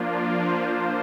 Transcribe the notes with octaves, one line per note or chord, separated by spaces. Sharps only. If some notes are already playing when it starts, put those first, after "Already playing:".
Already playing: F3 A#3 D4 F4
D5
C5